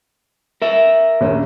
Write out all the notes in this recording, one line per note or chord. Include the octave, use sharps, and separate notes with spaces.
A#4 E5
A#1 D#2 C#4